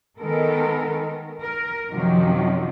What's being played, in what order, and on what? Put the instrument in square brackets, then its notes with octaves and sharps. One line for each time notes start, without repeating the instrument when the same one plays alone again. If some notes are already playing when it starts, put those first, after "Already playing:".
[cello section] D#3 G#3 B3 A4 A#4
A#4
F#2 C3 D#3 F3 F#3